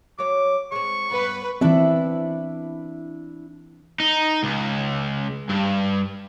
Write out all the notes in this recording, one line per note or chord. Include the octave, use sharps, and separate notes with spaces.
F#3 C#5 D6
G#3 C4 C#6
G2 B3 B4
E3 C4 D4 E4 E5
D#4
C#2
G2